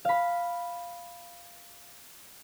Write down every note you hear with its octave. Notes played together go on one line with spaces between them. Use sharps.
F5 B5